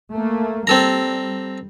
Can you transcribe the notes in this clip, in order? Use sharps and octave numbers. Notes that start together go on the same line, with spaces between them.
A3 A#3
G3 C4 A4 A#5